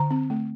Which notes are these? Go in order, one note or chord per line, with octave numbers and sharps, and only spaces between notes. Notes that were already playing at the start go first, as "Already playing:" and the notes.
Already playing: D3 A#5
C4
A3